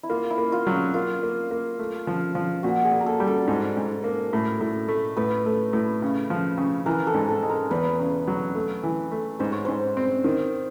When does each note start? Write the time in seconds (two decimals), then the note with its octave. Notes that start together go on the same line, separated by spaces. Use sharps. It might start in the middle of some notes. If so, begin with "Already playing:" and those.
0.03 E4
0.10 A#3 F4
0.31 E4
0.38 A#3
0.52 F4
0.67 F#3
0.94 A#3 F4
1.23 A#3
1.51 A#3
1.79 A3
2.07 F3
2.35 F3
2.63 A#2 F#4
2.84 G#4
2.91 A#2
3.00 A#4
3.06 A4
3.20 G3
3.27 A4
3.48 G#2
3.77 G#2
4.04 A#3
4.33 A2
4.61 A2
4.88 A3
5.17 A2 B4
5.46 A3
5.73 A2
6.02 C#3
6.30 F3
6.58 C#3
6.86 E3 A#4
7.07 A4
7.14 G#2
7.28 A4
7.43 G#3
7.49 A#4
7.71 E2 B4
8.00 C#3
8.28 F#3
8.55 A3
8.83 E3
9.12 A3
9.39 G#2 C5
9.52 C#5
9.65 G#2 C5
9.97 C4
10.24 D#3